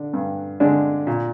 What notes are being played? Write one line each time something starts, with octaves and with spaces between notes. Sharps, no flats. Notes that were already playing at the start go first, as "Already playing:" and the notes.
Already playing: D3 D4
G2
D3 G#3 D4
A#2